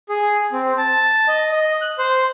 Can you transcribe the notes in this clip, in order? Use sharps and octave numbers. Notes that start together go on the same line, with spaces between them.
G#4
C4
A5
D#5
D#5
F#6
C5